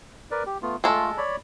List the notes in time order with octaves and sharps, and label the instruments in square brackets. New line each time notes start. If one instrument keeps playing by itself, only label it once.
[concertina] A#4 B4 D5
G4
A3 B3 F4
[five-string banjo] G#3 A4 [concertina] A3 F4
[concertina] C#5 D5 B5